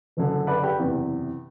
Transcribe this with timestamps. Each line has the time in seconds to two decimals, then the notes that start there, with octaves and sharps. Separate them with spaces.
0.17 F#1 F#2 D3
0.47 B4 D5
0.63 G4 B4
0.79 F#1 E2 C3 E3